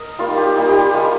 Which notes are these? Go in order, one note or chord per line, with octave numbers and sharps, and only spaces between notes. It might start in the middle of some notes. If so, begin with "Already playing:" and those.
Already playing: A#4 D#5
G3 A#3 D#4 F4
G4
G3 A#3 D#4 G4
G4
G4
G#3 D#4 F4